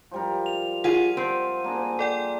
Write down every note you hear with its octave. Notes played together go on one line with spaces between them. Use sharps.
F3 G3 A#4
F7
F4 G#4 F#5 D#7
C4 F4 A5
A#3 D4 G#4
A4 D5 G5